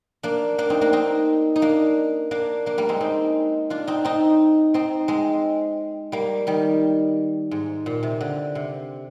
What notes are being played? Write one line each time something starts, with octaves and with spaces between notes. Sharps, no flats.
A#3 D4
A#3 D4
C4 D#4
A#3 D4
C4 D#4
D#4
A#3 D4
A#3 D4
A#3 D4
G3 A#3
G#3 C4
C4 D#4
D4 F4
C4 D#4
C4 D#4
C4 D#4
G#3 C4
G3 A#3
D#3 G3
G#2
A#2
C3
D3
C3